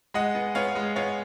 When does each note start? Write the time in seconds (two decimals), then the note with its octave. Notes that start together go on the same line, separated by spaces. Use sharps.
0.14 G#3 D#5 F#5
0.35 B3
0.55 B3 C#5 F5
0.75 G#3
0.96 B3 C#5 F5